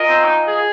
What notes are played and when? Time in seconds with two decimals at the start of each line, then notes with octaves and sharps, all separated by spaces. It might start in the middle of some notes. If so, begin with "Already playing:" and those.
Already playing: F4 A#4 D#5 G#5
0.09 C4
0.25 D#4
0.48 G#4